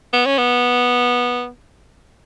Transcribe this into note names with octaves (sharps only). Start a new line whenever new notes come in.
B3
C#4
B3